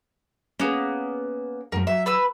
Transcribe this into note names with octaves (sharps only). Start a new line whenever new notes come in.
A#3 B3 C#4 G#4
F#2 F3 A3 A#4
F#3 E5
B4 B5 E6